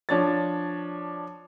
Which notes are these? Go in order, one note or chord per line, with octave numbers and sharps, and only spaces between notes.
F3 D4 C#5 A6